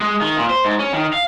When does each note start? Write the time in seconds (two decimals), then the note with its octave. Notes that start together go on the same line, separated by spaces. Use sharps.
0.01 G#3
0.21 D#3
0.37 A#2
0.50 C5
0.64 G#2
0.79 C#4
0.93 D#3
1.13 F5